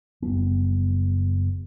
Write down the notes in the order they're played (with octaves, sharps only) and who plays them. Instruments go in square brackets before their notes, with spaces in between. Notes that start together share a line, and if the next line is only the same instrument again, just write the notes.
[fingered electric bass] F#1 G3 B3